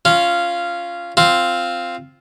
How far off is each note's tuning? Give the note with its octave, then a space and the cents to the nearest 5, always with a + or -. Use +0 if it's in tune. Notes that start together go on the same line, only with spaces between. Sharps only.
C#4 +0 F4 -10
C4 +0 F4 +0